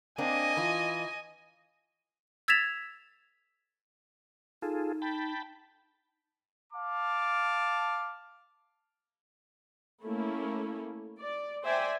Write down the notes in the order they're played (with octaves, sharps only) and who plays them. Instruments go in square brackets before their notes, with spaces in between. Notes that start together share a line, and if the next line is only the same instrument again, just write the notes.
[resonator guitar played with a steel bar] A#3 C4 D4 [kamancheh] D#5 G#5
[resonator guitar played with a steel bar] E3 F4
[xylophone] E6 G#6 A6 B6 E7 F7
[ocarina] D#4 [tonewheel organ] F4 G#4 A4
[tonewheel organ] G5 A5 B5
[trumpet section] F5 A5 D6
[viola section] A3 A#3 C#4 E4 A4
D5
C5 D5 E5 G5 G#5